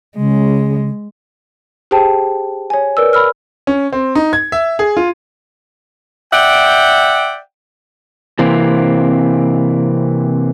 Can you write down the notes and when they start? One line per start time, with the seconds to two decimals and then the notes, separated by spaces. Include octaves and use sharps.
0.17 C#3 G#3
1.91 G4 G#4 C5 G5 A5
2.70 C#5 G#5
2.97 A#4 B4 D5 E6
3.13 B5 E6 F6
3.67 C#4
3.93 C4
4.15 D#4
4.33 G#6
4.52 E5
4.79 G#4
4.97 F4
6.33 D5 E5 F#5 G5
8.39 C3 E3 A#3 C4